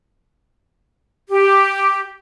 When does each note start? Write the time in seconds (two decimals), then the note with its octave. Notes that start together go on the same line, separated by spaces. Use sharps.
1.30 G4